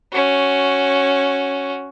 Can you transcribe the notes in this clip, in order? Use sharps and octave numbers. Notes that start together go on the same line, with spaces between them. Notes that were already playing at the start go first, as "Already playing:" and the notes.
C#4 F#4